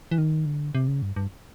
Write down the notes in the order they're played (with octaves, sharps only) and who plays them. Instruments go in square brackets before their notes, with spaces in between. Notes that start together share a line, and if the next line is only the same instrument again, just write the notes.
[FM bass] E3
D#3
D3
C3
C#3
G2
G2